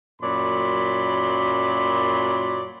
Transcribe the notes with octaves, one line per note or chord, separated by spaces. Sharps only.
F#2 A#2 F#3 D5 B5 C6